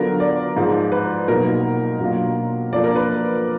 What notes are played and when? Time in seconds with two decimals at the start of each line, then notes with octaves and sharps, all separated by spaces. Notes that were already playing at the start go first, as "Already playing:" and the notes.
Already playing: D3 F#3 B3 D4 F4 A#4
0.20 D5
0.56 G#2 F3 G#3
0.92 B4
1.28 B2 F#3 A#3 D#4 A#4
2.00 B2 F#3 A#3 D4 F4
2.72 F2 F3 A#3 D4 D5
2.84 A#4
2.96 B4